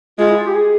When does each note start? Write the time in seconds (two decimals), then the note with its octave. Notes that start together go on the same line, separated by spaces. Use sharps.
0.19 G#3 F4
0.28 E4
0.36 F4
0.46 G4
0.55 G#4